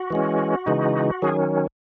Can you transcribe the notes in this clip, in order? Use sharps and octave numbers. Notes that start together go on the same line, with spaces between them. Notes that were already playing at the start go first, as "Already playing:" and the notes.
Already playing: F#4
E3 G#3 C#4
C#3 E3 G#3 D#4
D#3 F#3 C#4 G#4